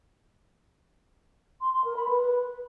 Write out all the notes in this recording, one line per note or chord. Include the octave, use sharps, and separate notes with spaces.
C6
C6
A#4
B5
B4